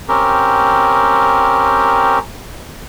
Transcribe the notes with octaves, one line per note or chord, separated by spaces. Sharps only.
C4 C#4 G4 A#4